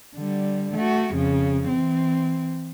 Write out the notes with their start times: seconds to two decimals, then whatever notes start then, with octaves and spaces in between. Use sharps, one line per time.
0.15 D3 G3
0.75 A3 F#4
1.14 F2 C#3
1.68 E3 C4